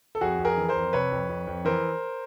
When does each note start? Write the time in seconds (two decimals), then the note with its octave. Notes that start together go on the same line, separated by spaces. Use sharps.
0.15 A4
0.21 F2 F#4 G#4
0.39 F2
0.45 G#4 A#4
0.58 E3
0.68 A#4 C5
0.75 F2
0.93 C3 B4 C#5
1.12 F2
1.29 F2
1.47 F2
1.65 E3 A#4 C5